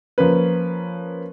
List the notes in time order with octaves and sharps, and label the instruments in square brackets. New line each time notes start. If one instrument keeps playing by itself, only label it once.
[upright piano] F3 A#3 C#4 B4